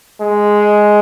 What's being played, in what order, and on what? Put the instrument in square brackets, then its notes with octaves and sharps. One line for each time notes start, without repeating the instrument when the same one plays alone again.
[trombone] G#3